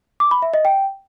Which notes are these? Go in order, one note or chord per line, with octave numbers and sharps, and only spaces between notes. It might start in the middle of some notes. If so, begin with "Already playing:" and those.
D6
B5
E5
D#5
G5